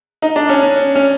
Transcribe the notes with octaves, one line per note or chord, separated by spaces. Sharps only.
D#4
D4
C#4
C#4
C#4